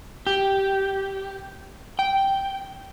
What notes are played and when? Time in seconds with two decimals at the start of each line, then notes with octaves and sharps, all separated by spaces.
0.27 G4
1.99 G5